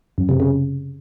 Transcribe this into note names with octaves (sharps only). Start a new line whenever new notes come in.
F#2
C3
C#3